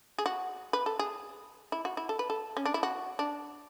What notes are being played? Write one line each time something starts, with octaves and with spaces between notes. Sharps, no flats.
G#4
F#4
B4
A4
G#4
E4
F#4
E4
A4
B4
A4
C#4
D4
E4
F#4
D4